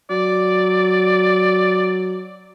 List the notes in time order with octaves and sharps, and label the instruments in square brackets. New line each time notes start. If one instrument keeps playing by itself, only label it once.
[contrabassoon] F#3 [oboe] D5